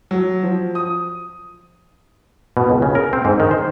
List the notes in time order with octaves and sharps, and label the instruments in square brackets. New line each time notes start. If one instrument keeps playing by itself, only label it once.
[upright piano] F#3
F3
D#6
[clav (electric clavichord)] B2
C#2
C#3
A#4
C4
G#2
D#3
C5